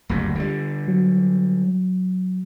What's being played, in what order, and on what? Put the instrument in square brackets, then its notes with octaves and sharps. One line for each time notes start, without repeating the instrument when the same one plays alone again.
[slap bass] F#1 D2 G2
D3 G3
[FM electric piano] F#3